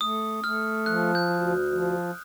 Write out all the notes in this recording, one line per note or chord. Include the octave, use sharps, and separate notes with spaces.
A3 D#6
A3 F6
F3 F#6
G6
D2
F3